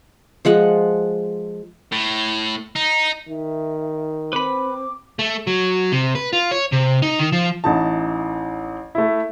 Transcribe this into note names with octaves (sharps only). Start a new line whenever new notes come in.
F3 G#3 F#5
A2
D#4
D#3 E5
C4 B4 B5 D6
A3
F#3
C3
B4
F4
C#5
C3
D#4
D#3
F3
A1 E3 D#4 A5
A3 E4